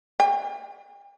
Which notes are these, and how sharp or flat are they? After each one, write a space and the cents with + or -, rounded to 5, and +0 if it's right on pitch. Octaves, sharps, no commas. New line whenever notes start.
G5 +45